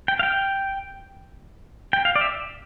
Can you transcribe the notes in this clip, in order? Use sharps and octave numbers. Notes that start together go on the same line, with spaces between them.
G5
F5
G5
G5
F5
D5
E5